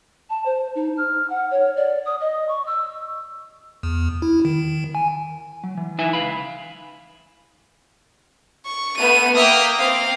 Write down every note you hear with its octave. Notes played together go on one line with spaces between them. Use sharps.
A5
C5
D#4
F6
F#5
C#5
D5
D#6
D#5
C#6
E6
E2
E4
D#3
G#5
F#3
E3
D#4 E4 B4 E5 G#5
C#2 D#3 F5 B5
C#6
A3 B3 D#7
A#3 E5 G5 D#6 F6
C4 F5